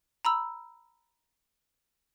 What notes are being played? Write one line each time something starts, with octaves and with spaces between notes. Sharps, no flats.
A#5 B5 E6